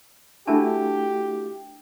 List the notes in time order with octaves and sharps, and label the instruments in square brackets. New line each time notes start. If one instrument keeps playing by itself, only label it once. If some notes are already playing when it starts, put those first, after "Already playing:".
[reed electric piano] A3 E4 F#4 [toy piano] D4 A5 [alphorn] G4